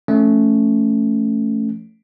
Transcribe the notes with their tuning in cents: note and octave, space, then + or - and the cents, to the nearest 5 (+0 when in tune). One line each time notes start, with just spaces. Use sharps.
F3 -35 A3 +0 C#4 +0